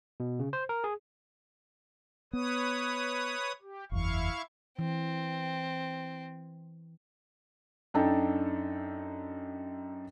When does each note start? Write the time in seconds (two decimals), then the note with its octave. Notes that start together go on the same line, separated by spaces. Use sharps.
0.20 B2
0.39 C#3
0.53 C5
0.69 A#4
0.84 G#4
2.33 B3 B4 C#5 D#6
3.62 G4
3.92 F#1 E2 E4 F5 C#6
4.79 E3 C4
7.94 F#2 D4 D#4 A4 G5